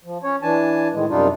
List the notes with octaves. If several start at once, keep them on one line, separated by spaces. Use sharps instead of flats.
F3
C#4 C#5
E3 D4 G#5 A5
A2 D#3 G#3
F#2 C3 G3 D4 D#4 F4